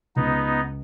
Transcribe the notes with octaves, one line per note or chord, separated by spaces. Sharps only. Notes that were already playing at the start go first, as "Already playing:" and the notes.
C#2 B3 D#4